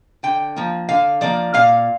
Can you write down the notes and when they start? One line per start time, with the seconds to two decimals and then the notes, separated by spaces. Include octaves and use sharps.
0.23 D3 G5
0.56 F3 A#3
0.89 D3 F5
1.21 F3 A#3 D5
1.54 A#2 F5